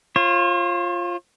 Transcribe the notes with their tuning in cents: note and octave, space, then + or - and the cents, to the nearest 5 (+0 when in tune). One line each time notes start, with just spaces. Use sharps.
F4 +0 C#5 -45